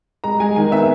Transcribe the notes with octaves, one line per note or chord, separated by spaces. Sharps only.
G#3 A#5
G#3 G#5
D#3 G#5
B3 E5